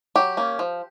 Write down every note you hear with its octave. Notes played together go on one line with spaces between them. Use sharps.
F#3 G4
A#3 C#4
F3